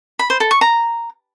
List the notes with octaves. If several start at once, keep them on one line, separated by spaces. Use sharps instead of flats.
B5
C5
A4
C#6
A#5